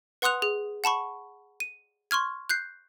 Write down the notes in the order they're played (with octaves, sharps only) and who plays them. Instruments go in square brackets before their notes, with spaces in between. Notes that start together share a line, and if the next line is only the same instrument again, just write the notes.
[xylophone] B4 F#5 C6 D#6 F#6 F7
G#4
F#5 A5 B5 C#6
D#7
C6 C#6 F6 G#6
F#6 G6 C7